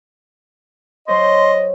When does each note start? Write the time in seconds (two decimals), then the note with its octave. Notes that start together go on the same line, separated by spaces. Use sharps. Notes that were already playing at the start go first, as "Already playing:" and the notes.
1.08 F#3 C5 C#5 D#5 C6